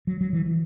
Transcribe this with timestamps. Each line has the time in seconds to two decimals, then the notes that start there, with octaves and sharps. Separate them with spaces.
0.07 F#3
0.21 F#3
0.33 E3
0.46 E3